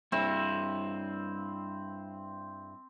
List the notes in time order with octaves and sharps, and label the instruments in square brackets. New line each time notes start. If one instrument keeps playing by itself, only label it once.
[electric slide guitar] G2 E4 [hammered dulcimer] C4